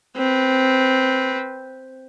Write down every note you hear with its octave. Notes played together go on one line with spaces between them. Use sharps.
C4 B4